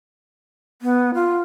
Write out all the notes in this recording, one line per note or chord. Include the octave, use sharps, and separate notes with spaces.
B3
F4